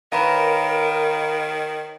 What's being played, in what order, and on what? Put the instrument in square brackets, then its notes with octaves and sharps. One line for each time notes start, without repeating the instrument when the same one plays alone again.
[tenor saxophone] D#3 [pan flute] A#4 [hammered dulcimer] B4 C#5 [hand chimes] F5 A#5 B5